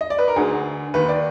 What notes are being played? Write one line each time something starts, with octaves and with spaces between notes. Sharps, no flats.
D#5
D5
B4
A#4
D2 D3 G#4
D#2 D#3 B4
D5